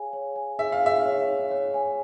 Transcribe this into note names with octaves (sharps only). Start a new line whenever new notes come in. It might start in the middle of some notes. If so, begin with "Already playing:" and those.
Already playing: G#4 C#5 F5 G#5
C#5
G#5
G#4 E5
F5
G#4 E5
C#5
C#5
C#5
G#5